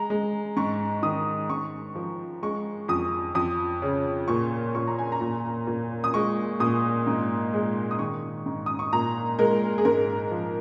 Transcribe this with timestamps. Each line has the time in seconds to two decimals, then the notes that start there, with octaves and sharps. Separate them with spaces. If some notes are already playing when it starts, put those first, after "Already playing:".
Already playing: G#3 A#5
0.10 G#3
0.57 G#2 C#6
1.03 D#3 D#6
1.50 G#2 C#6
1.95 F3
2.43 G#3 C#6
2.88 F2 D#6
3.35 F2 D#6
3.82 C#3
4.28 A#2 C#6
4.75 A#2 C#6
4.87 A#5
4.99 G#5
5.12 A#5
5.21 A#2
5.67 A#2
6.04 D#6
6.14 G#3 C#6
6.60 A#2 D#6
7.07 G#2
7.54 G#3
7.91 D#6
7.99 D#3 C#6
8.46 G#2
8.66 D#6
8.79 C#6
8.92 A#2 A#5
9.39 G#3 A#4
9.78 G#4
9.85 G#2 A#4
10.31 F3